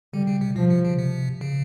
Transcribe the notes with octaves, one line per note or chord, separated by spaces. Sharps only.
D3 G3
C#3
C3
B2 F3
C3
C#3
C3
C#3